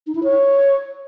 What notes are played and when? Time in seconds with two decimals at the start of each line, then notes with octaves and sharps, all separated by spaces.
0.07 D#4
0.15 E4
0.23 C#5